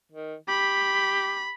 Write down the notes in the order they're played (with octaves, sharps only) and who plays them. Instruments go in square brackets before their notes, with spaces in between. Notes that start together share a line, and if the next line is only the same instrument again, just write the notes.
[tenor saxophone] D#3
[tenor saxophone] G4 [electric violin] B5